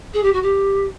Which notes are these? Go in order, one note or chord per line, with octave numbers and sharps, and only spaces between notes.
G#4
G4
F#4
G4